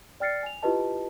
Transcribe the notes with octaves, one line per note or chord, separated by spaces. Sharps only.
D5 G5 F6 A6 C7 C#7
G#5 F7
E4 F4 G4 B4 D#5 A5